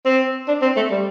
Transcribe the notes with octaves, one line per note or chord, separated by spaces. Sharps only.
C4
D4
C4
A3
G3